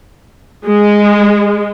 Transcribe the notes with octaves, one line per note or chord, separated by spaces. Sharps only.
G#3